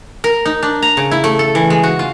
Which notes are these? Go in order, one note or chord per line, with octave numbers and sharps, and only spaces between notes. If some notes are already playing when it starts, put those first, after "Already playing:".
A#4
D#4
D4
A#5
C#3
E4
A3
A4
E3
G#3
F#4
F4